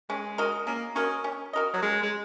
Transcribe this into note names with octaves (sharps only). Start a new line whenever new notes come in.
G#3 C#4
F#4 A#4 D#5
A#3 C#4
C#4 F#4 A#4 D#5
C#4
F#4 A#4 D#5
F#3
G#3 C#4
G#3